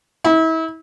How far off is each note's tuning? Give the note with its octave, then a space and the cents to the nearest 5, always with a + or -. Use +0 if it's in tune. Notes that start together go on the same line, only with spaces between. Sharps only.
E4 -35